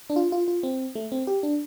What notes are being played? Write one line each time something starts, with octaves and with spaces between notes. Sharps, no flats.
D4
F4
F4
F4
C4
A3
C4
G4
D4